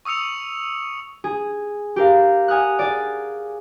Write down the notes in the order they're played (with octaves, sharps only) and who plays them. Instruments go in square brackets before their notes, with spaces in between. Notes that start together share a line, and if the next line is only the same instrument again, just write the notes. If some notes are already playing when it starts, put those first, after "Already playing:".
[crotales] C#6 D#6 E6 C#7 F7
[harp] G#4
G4 A#4 F5
F#5 G#5 D#6 F6 F#6
G#4 D5